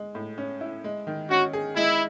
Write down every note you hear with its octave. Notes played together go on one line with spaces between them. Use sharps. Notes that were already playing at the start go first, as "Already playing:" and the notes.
Already playing: G#3
A2
C#4
E4
G#3
D#3
C#4 F#4
G#4
G#3 E4